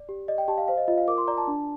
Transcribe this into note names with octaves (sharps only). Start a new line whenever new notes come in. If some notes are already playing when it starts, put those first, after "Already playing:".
Already playing: D5
G4
D5 D#5
G5
G4 A5
F5
C5 F5
D#5
F4 D#5
F5
A#4 D6
C6
D5 A#5
A5
D4